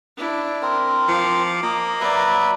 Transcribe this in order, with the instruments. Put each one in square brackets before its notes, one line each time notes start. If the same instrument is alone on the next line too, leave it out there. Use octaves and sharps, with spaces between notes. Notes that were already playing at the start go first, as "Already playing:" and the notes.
[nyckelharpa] D4 E4
[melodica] C4 A#4
[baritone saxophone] F3 [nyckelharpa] D6
[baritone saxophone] A#3 [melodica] D#5
[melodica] F#3 B4 E5 [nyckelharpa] D5